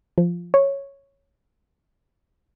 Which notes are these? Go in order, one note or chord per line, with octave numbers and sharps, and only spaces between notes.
F3
C#5